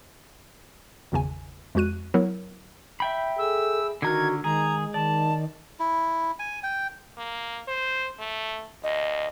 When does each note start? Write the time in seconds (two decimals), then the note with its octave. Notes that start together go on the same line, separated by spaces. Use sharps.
1.12 G#1 E2 C#3 G#5
1.75 F2 G#3 F#4 F#6 D#7
2.14 F#3 B3 E4 A#4
3.00 E5 G5 B5
3.38 G#4 A4 E6
4.02 D3 D#3 F#4 A#5 F6 G#6
4.44 D#3 G#3 G#4 A#5
4.94 D#3 D5 A5
5.79 E4
6.39 G#5
6.63 G5
7.17 A#3
7.68 C5
8.19 A3
8.84 D2 D#5